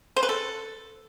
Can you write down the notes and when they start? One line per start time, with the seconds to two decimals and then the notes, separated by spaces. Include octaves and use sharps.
0.16 C5
0.23 B4
0.29 A4